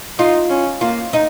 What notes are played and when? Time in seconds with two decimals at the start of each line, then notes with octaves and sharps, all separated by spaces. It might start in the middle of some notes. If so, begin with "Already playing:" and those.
0.19 D#4 F4
0.50 C#4
0.81 A#3 F4
1.13 D#4